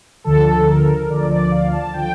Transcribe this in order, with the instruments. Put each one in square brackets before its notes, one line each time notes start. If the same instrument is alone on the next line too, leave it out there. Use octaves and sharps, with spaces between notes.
[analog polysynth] D2 D3 F3 A4
A#4
D2 D3 F3 D5
D5
F5
A5
D3 F3 G5